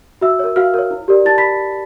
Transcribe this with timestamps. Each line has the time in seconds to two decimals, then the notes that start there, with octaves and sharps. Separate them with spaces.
0.21 F#4 E5 E6
0.39 A#4 C#5
0.56 F#4 F5 F6
0.74 A#4 C#5
0.91 E4
1.08 G4 A#4 D5
1.25 E4 A5 A6
1.38 B5 B6